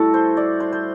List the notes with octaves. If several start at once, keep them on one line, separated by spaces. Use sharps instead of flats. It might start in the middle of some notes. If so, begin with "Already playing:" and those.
Already playing: A2 G3 E4 F#4 A4
C5
D5
C5
C5